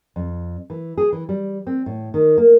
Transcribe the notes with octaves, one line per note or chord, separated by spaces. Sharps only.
F2
E3
G#4
E3
G3
C4
A2
D#3
A#3